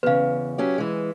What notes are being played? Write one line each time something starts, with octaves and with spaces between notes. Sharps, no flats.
E2 C#3 B4 F5
F#3 C#4 G4
E3 G#3